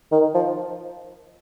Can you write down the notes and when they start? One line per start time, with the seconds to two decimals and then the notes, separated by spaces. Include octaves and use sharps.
0.12 D#3
0.35 F3